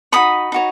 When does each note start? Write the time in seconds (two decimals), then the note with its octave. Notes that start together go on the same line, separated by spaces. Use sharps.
0.12 D#4 F#4 C#5 B5 D#6
0.52 D#4 F#4 C#5